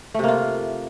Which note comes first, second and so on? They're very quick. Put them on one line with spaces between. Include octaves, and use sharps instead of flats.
A3 C3 A#3 F4